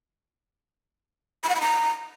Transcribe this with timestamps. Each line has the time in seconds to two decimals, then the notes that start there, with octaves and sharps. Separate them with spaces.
1.43 B5
1.49 F#5
1.55 B5
1.61 A#5